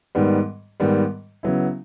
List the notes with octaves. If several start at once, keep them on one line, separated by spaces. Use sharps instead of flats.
G#2 D#3 G3 B3
G#2 D#3 G3 B3
C#3 F#3 B3 E4